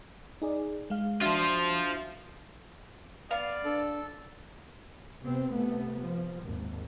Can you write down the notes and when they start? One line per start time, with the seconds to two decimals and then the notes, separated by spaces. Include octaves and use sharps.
0.42 D#4 G#4 D5
0.90 G#3 F5
1.21 D4 F4 F#4 C5 E5
3.31 B3 D5 F5
3.65 D4 A4
5.24 C3 B3 C4
5.53 C3 A3 B3
6.01 F3
6.44 G#1 D#2